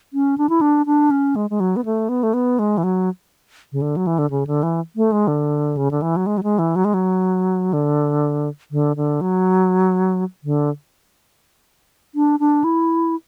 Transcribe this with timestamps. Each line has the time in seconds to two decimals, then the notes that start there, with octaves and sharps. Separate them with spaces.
0.13 C#4
0.38 D4
0.49 E4
0.61 D4
0.86 D4
1.11 C#4
1.36 G#3
1.50 G#3
1.60 F#3
1.76 B3
1.85 A3
2.09 B3
2.23 A3
2.34 B3
2.59 G#3
2.78 E3
2.84 F#3
3.72 C#3
3.82 D3
3.96 F#3
4.07 E3
4.18 D3
4.30 C#3
4.47 D3
4.63 E3
4.96 A3
5.12 G#3
5.28 D3
5.77 C#3
5.91 D3
6.02 E3
6.16 F#3
6.26 G#3
6.38 F#3
6.43 G#3
6.59 E3
6.76 F#3
6.85 G#3
6.94 F#3
7.73 D3
8.71 D3
8.96 D3
9.21 F#3
10.44 D3
12.15 D4
12.40 D4
12.64 E4